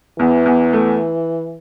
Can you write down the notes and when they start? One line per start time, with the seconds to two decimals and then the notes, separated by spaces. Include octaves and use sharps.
0.19 E2 E3
0.46 E2
0.73 A3